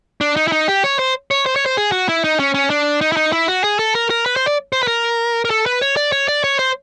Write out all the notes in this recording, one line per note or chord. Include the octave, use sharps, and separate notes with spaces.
D4
D#4
E4
D#4
G4
C#5
C5
C#5
C5
C#5
C5
G#4
F#4
E4
D#4
C#4
C#4
D4
D#4
E4
D#4
E4
F#4
G#4
A4
A#4
A#4
B4
C5
D5
C5
B4
A#4
A#4
A4
B4
C#5
D5
C#5
D5
C#5
C5